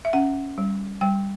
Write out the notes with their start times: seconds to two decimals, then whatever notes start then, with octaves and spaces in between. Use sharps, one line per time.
0.05 E5
0.13 C#4 F#5
0.58 G3
1.01 G3 G5